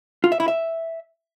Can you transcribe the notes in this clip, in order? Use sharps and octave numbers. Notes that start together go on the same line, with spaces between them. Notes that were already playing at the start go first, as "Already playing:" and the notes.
F4
E5
E4
E5